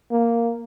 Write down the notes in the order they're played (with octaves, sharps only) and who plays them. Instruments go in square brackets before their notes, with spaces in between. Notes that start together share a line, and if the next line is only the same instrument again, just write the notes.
[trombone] A#3